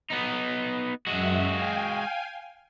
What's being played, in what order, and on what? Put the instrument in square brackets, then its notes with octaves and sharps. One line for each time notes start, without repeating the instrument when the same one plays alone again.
[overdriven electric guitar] B3 D#4
[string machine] F#2 E5 [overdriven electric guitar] G#3 F#4
[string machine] F5 G5 G#5